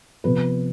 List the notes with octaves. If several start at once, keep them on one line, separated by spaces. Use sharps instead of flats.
C3 F3 B3 B4